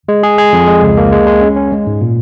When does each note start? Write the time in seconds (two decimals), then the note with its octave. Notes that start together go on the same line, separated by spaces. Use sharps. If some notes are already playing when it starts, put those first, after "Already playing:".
0.09 G#3
0.23 G#4
0.38 G#4
0.53 F2
0.67 G#3
0.82 C#2
0.97 A#3
1.12 G#3
1.27 G#3
1.41 C#4
1.56 C#4
1.72 G#3
1.87 G#2
2.01 A#2